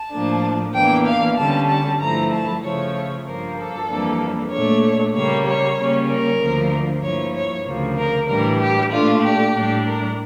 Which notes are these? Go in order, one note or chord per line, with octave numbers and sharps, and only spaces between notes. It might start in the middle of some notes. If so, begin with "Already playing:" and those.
Already playing: A5
A2 F3 A#3 D4
E2 E3 A#3 D4 G5
F5
D3 G3 C#4 A5
A5
G2 F3 A3 E4 A#5
A5
C#3 F3 A3 C#5
G2 F3 A#3 A#4
A4
F2 E3 G3 A#3 D4
A#2 A3 D4 C#5
C#3 G3 A#3 C#5
C#5
C#3 G3 A#3 C#4
A#4
D2 D3 F3 A#3
G2 F3 A#3 E4 C#5
C#5
D2 C#3 F3 A#3
A#4
A2 E3 G3 D4 A#4
G4
A#2 A3 D4 F4
G4
A2 G3 D4
A#4